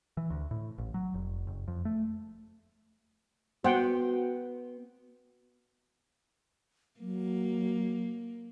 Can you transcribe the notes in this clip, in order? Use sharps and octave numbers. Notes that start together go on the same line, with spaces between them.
E3
D2
A2
A1
F#3
F1
F#1
F2
A3
B3 F#4 C5 F#5 G5
F#3 A#3